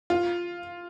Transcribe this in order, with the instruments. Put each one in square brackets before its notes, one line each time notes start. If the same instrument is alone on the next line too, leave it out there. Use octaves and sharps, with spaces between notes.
[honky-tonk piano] F4